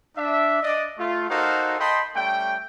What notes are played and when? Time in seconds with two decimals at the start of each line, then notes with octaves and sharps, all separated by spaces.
0.17 D4 E5
0.62 D4 D5 D#5
0.99 A3 F4
1.30 D#4 F#4 A4 A#4 C5 F5
1.79 D#5 G5 A5 B5 C6
2.15 G3 A3 C#4 G5